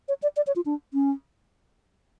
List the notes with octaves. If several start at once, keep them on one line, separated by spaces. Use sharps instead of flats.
C#5
D5
D5
C#5
F4
D4
C#4